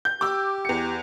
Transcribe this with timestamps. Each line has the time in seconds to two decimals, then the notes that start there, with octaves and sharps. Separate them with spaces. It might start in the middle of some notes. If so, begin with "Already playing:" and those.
0.05 G6
0.21 G4 D6 E6
0.65 E2 C#7